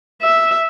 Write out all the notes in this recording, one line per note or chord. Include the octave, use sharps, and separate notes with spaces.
E5